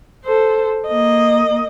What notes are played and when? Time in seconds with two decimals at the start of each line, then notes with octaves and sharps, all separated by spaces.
0.25 A4 C5
0.88 A#3 D#5